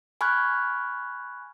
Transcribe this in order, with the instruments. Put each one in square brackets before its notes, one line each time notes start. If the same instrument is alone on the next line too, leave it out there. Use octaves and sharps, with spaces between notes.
[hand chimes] G#5 B5 C#6 F6 F#6 G#6